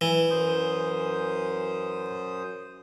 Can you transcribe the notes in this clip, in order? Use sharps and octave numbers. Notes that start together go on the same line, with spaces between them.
E3
F#2 C5 D#6